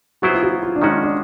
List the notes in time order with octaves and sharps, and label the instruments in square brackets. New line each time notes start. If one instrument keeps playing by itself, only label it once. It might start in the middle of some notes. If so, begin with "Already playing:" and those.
[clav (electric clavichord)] F#3 B3 E4 G#4 C5 [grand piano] F#4
[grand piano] F4
F#4
F4
D4
[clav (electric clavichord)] D#3 G#3 C#4 F#4 [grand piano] D#4
[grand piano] D4